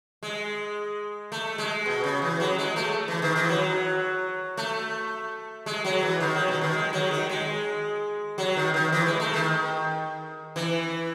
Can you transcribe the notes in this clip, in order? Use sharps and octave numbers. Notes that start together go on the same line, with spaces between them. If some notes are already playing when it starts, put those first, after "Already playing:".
G#3
A3
G#3
B2
C#3
E3
F#3
G#3
A3
E3
D#3
E3
F#3
A3
G#3
F#3
E3
D#3
F#3
B2
D#3
G#3
F#3
D#3
G#3
F#3
D#3
D#3
E3
G#3
A3
D#3
E3